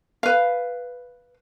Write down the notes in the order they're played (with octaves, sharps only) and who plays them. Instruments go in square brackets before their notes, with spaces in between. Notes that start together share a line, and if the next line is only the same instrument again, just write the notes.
[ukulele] B4 F5